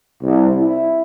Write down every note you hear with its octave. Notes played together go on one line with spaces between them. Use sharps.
C2
E4